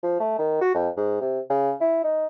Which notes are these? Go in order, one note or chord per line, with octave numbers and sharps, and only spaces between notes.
F3
A3
D#3
F#4
F2
G#2
C3
C#3
E4
D#4